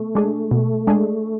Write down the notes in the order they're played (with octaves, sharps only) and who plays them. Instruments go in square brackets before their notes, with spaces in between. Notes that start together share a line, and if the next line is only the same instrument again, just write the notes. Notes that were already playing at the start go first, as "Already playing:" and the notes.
Already playing: [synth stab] B2 [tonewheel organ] A3
[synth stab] G#3 D4 G#4
B2
G#3 D4 G#4